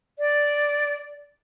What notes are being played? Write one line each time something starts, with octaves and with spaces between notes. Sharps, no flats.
D5